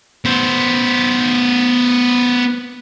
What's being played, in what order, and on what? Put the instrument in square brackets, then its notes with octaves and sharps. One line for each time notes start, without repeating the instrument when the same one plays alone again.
[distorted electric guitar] B3 C5